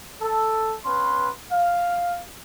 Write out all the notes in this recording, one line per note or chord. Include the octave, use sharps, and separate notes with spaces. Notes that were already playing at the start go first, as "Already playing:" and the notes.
A4
B3 C#4 B4 C6
F5